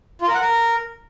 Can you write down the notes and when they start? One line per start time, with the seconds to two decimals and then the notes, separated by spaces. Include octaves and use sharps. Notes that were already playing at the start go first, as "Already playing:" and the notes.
0.21 F4
0.28 A#4
0.34 F#5
0.41 A#4